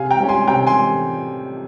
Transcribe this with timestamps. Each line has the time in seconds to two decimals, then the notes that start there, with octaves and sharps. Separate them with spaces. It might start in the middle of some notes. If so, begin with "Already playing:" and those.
Already playing: C3 F5 G#5
0.11 G5 A#5
0.20 G3 C#4
0.29 G#5 C6
0.47 C3 G5 A#5
0.67 G#5 C6